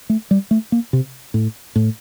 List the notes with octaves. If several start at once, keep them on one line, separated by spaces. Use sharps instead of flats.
A3
G3
A3
A#3
C3
A2
A2